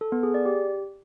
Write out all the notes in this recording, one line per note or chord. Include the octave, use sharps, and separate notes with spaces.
A4
B3
G#4
D5
G4